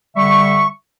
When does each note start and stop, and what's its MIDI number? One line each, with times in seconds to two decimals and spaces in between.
0.16 0.67 50
0.16 0.67 55
0.16 0.67 76
0.16 0.67 85